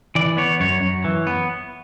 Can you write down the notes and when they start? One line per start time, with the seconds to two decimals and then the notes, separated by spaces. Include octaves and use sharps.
0.15 E3 D5
0.37 B3 C#5
0.60 F#2 C#5
0.83 F#2
1.04 E3
1.27 B3